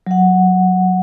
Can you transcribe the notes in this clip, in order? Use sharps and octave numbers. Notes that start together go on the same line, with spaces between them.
F#3 F#5